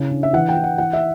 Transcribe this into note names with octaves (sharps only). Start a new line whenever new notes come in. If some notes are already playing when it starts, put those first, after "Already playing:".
Already playing: C#3 E4
D4
E5
E3 F#5
G5
E3
F#5
E3 F#5
E5